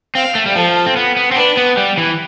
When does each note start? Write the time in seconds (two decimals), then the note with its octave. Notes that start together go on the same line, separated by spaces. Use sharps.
0.15 C4 F5
0.35 A3
0.46 G3
0.56 F3 A4
0.86 C4
0.96 B3
1.17 B3
1.31 C4
1.36 D4 B4
1.57 B3
1.77 G3
1.98 E3